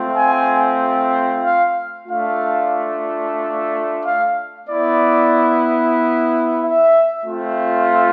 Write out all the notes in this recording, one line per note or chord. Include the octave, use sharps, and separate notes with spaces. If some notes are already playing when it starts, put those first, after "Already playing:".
Already playing: A3 C4 F4
G#5
F5
A3 D4 F4 F5
F5
B3 E4 D5
E5
A3 C4 F4